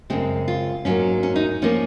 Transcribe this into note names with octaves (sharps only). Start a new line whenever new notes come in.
F#2 C#3 G#3 C4
F4
G#2 F#3 A#3 C#4
C#4
D#4
F3 A#3 C#4